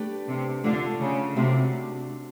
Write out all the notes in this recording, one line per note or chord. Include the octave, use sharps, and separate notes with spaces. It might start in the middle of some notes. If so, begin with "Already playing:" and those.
Already playing: A3 D4 G4 B4 D5
C3
D3 A3 D4 F4
C#3
C3 A3 D4 F#4